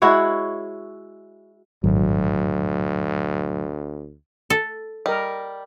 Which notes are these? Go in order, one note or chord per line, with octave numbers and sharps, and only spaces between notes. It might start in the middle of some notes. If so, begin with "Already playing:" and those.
G#3 E4 F#4 C#5
G#1 D2 G2 A#2 F#3
A4
G3 A#4 D#5